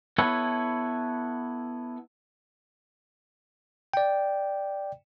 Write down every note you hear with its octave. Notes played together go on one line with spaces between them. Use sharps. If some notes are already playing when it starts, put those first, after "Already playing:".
B3 E4 A4 B4 C#5
D5 G5